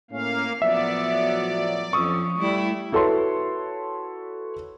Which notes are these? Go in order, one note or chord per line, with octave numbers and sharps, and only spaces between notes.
A2 A#3 C#4 F5
A2 F3 F#3 B3 D5 E5
F2 F3 C#4 C#6 D#6 E6
G3 A3 E4
E4 F#4 A4 B4 C#5 C6